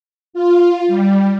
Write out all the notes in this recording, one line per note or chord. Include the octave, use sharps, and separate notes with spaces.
F4
G3